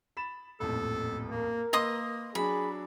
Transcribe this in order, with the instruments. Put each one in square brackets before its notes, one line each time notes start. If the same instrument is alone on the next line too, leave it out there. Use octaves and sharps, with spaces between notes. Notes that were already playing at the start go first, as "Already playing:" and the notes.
[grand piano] B5 A6 E7
[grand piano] D#1 A1 F2 [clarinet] A4
[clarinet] A#3 [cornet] A#4
[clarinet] A#3 [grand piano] B4 E6 [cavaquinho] D#5 C6 D#6
[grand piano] F#3 D4 [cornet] G#4 [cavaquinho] B5